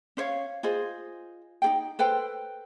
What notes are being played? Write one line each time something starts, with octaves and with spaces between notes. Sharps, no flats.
C#4 C5 C#5 F5
F4 G#4 C5 D#5
D#4 G#4 G5
A4 B4 C5 G5